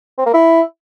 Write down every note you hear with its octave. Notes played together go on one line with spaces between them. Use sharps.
C4
A#3
E4